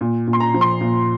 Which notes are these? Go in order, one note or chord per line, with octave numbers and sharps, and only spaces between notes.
A#2
A#2
C6
A#5
F3
C6
A#2